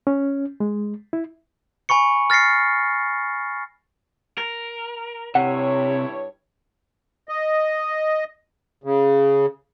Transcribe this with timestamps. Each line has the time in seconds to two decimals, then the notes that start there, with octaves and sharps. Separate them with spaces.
0.07 C#4
0.60 G#3
1.13 E4
1.89 G#5 B5 C#6 C#7
2.30 F6 A6 A#6 C7 C#7
4.38 A#4
5.35 G2 C3 E4 C#5 F#5
7.29 D#5
8.84 C#3